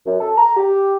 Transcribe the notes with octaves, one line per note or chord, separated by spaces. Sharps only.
F#2
A4
A#5
G4